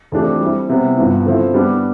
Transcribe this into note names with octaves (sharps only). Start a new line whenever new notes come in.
F2 E3 A3 D4 G4
G3 C4 E4
C3 G3 B3
G2 F3 B3 E4
D3 F3 C4 E4
G3 B3 D4